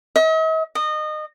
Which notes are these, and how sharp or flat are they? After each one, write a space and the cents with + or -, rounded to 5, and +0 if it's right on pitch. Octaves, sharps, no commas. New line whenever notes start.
D#5 +45
D#5 -25